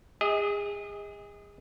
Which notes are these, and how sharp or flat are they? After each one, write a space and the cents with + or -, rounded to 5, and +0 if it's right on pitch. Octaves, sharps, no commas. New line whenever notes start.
G#4 -30 D#5 +25